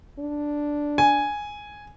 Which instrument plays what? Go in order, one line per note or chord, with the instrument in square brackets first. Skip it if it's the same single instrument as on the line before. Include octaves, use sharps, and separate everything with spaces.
[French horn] D4
[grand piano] G#5